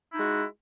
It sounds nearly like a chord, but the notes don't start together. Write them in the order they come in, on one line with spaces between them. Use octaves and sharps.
E4 D#4 G#3 F#4